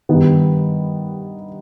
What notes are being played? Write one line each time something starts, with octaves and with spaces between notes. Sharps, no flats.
G2 D#3 B3